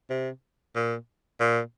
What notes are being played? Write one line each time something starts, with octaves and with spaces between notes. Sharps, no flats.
C3
A#2
A#2